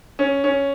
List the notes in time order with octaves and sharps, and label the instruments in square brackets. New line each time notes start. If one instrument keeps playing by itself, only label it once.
[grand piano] C#4
C#4